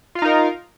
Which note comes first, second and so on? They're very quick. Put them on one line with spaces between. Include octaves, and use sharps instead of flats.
F4 F5 D#4 A#4